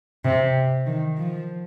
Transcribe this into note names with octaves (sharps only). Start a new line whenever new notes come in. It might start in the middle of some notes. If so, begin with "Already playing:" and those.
C3
D#3
F3